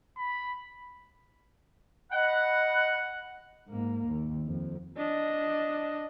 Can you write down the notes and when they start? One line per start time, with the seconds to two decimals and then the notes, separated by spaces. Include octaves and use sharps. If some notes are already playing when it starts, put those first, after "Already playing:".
0.17 B5
2.11 D#5 F#5 B5 F#6
3.68 G#2 A#3
4.08 D#2
4.47 F2
4.97 D4 D#5